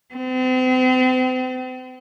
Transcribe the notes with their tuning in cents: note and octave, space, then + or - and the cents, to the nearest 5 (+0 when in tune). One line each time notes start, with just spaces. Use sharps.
C4 -40